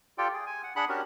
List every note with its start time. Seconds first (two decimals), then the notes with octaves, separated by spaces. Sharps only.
0.18 F4 G4 A4 D5 G5
0.34 G#4
0.46 G#5
0.63 F#5
0.76 D4 G#4 F#5 B5 F#6
0.89 C#4 D4 F#4 G4 A#4